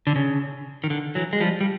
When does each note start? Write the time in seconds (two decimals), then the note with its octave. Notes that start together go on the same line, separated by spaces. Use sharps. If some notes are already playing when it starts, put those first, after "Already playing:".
0.07 D3
0.16 C#3
0.84 D#3
0.90 D3
1.15 E3 F#3
1.33 G#3
1.40 F3 G3
1.61 G3